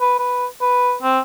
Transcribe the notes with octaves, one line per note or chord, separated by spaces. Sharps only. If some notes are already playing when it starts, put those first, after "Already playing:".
B4
B4
B4
C4